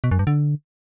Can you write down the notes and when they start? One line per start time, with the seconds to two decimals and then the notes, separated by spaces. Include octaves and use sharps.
0.04 B2
0.11 F#2
0.19 G2
0.27 D3